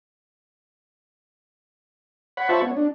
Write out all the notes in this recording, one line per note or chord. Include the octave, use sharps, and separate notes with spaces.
C#5 F#5 B5
F4 C5 E5 A5 B5 C#6
B3 C#5
D4